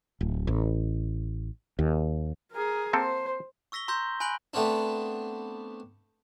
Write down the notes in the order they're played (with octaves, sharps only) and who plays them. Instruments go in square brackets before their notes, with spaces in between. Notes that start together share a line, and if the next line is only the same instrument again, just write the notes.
[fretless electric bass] D1
A1
D#2
[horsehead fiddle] G#4 A#4
[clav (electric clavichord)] A#3 C4 A4 [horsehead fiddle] C5
[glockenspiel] C#6 E6 A#6 B6 G7
A#5 C6 E6 G6 A#6
G#5 B5 F#6 D7 F#7
[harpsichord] A3 B3 C4 D4